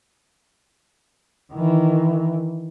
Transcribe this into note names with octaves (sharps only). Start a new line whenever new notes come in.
D#3 E3